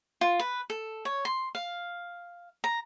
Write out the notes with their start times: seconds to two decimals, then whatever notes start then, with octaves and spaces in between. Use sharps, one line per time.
0.21 F4
0.39 B4
0.70 A4
1.05 C#5
1.25 C6
1.55 F5
2.64 A#5